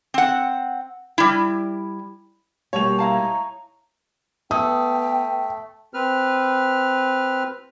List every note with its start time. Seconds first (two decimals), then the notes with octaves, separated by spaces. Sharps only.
0.14 C4 F#5
1.18 G3 E4
2.73 B2 G3 A#3 C#5 F7
2.99 E4 F5 A5 A#5
4.51 A3 B3 G5 D#6
5.94 C4 B4 F6